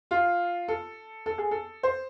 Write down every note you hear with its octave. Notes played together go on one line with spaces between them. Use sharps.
F4
A4
A4
G#4
A4
C5